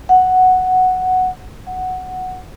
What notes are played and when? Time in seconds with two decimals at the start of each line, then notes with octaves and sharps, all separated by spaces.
0.09 F#5
1.67 F#5